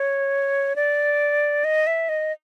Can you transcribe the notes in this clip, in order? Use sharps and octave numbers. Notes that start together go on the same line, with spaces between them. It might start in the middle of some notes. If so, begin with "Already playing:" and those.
Already playing: C#5
D5
D#5
E5
D#5